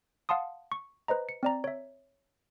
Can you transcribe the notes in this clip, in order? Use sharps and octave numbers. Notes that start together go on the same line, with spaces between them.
F5 F#5 A5 C6 D#6
C#6
B4 C5 D#5 A#5
C#7
C4 D5 A#5
C#5 E5